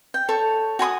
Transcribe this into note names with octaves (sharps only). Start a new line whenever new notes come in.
G5
A4 C#5 C#6
F#4 G#5 B5 D#6